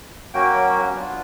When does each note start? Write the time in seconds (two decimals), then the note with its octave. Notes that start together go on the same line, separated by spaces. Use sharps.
0.34 F#3 A#3 C#4 F#4 G5
0.93 B3 D4 F4